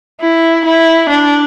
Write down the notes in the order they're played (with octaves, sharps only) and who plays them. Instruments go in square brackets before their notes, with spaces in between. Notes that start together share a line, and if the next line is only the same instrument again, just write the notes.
[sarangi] E4
E4
D4